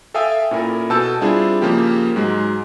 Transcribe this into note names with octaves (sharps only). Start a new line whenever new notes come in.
A4 E5 F5 G5 G#5 D#6
A#2 C#4 E4 A4 A#4
B2 A4 G#5 A5 E6 G6
G3 C4 D4 E4 F4 G#4
C#3 F3 A#3 G4
G#2 F#3 G#3